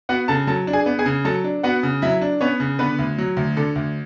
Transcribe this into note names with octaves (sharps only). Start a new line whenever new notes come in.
B3 F#4 F#5
C#3 A4 A5
F#3 A4 A5
D4
G#4 G#5
B3
G#4 G#5
C#3
F#3 A4 A5
D4
B3 F#4 F#5
C#3
F#3 E4 E5
D4
B3 C#4 C#5
C#3
D3 B3 B4
D2
F#3
D2
D3 A4
D2